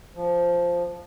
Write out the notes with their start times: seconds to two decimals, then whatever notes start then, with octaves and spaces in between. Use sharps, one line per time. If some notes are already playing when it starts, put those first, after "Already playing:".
0.15 F3